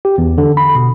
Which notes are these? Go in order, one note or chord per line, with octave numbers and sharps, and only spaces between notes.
G4
E2
D3
B5
B2